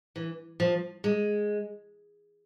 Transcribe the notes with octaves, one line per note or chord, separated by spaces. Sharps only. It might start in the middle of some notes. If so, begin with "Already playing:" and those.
E3
F3
G#3